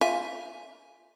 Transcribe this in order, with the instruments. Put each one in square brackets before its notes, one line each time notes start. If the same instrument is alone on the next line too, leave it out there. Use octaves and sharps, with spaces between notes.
[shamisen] F4 [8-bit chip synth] E5 G#5